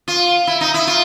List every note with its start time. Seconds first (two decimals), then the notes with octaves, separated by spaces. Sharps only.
0.08 F4
0.47 E4
0.61 D#4
0.74 E4
0.87 F4